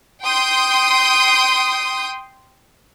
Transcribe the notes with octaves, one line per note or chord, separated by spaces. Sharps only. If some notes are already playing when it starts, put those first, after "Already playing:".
G5 C6 D#6 G6